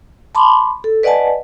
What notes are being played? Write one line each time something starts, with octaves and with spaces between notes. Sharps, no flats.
A5 B5 C6 D6
A4
B4 D5 D#5 F#5 G#5 A5